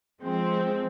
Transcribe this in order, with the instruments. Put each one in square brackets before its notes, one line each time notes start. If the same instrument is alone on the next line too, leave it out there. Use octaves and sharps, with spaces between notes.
[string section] F3 G#3 C4